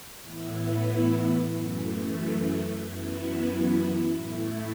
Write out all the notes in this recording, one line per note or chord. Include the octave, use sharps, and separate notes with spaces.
A2 E3 B3 E4
F#2 E3 A3
F#2 E3 B3 E4
A2 A3 E4